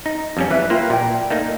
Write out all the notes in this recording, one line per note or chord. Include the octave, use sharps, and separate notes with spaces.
D#4
F2 G3 C#4
E3 B4 E5
A#3 F4 G4 B4
A#2 D5 G5
A3 A#3 D#4